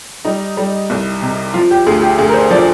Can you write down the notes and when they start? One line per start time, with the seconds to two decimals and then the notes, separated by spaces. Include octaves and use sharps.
0.25 G3 D#4
0.57 G3
0.90 C2
1.22 C3
1.54 F3 F4
1.71 G4
1.86 D2 G#4
2.02 G4
2.18 D2 G#4
2.29 A#4
2.34 C5
2.50 F3 D5